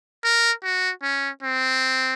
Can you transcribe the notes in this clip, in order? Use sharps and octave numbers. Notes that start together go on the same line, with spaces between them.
A#4
F#4
C#4
C4